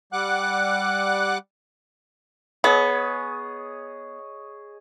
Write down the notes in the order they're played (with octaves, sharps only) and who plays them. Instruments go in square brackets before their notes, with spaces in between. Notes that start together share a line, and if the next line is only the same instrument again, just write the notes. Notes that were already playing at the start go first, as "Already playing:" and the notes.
[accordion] G3 F#5 D6 F#6
[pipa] B3 [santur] G#4 C#5 D#5